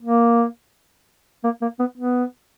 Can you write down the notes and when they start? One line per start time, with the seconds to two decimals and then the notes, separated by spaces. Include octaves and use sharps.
0.02 A#3
1.44 A#3
1.62 A#3
1.79 B3
1.97 B3